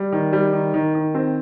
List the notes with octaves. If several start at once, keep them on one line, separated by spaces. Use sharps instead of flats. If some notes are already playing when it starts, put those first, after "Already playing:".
Already playing: G3
D#3
G3
D#3
D#3
D#3
C4